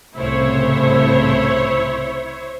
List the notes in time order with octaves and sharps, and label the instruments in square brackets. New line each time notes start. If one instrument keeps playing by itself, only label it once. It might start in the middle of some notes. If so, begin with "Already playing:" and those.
[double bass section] C2 A2 C#3 [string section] E4 C5 C#5